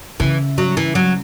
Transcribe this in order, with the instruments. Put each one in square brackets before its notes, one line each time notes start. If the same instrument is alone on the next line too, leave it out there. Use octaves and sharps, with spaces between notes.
[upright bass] C#3 [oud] E3
[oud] F#3
E3
F#3